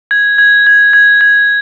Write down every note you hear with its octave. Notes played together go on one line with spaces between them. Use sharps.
G#6
G#6
G#6
G#6
G#6